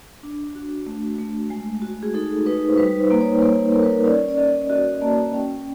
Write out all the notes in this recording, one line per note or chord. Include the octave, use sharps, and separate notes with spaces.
D4
F#4
A3
A3
G#3
F#4
G#4
D#4 A4
D#4 B4
C5
G3 B4
C5
A#3
C#5
A#3 B4
A#3 A#4
B4
A#4
C#4 D5
D5
C#4 D#5
F#4 D#5
A#3 A5
C#4 G5